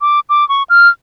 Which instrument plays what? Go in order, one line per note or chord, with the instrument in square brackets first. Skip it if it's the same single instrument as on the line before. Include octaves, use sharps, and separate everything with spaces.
[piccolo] D6
D6
C#6
F6